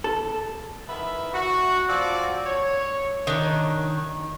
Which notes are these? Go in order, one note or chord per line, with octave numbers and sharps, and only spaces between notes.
A4
D#3 E3 B4 E5
F#4
F3 C4 F#4 D5
C#5
D#3 D4 C#5